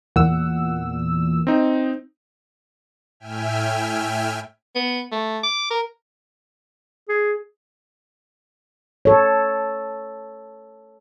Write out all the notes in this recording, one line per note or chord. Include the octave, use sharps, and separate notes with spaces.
E2 A#2 F#5 E6
C4 D#4
A2 E5 G5 G#5 F6
B3
A3
D6
A#4
G#4
A4 C#5